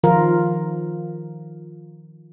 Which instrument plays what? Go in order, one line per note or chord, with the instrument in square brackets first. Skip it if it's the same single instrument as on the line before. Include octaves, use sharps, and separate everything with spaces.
[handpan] D#3 F3 F4 A#4